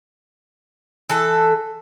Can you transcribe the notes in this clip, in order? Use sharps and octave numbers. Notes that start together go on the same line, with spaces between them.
E3 A4